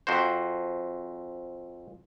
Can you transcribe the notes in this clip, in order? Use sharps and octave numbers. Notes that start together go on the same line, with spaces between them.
F2 F#4 C5